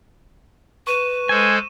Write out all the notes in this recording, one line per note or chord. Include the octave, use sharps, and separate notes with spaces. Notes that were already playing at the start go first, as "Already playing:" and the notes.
B4 C#6 D#7 E7
G#3 A4 C5 G#5